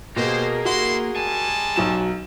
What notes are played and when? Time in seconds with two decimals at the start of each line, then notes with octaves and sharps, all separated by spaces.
0.16 B2 A#3 G4 G#4 A#4 C5
0.65 E4 F#4 C6
1.16 G3 G#3 G#5 A5
1.76 B1 F#3 E7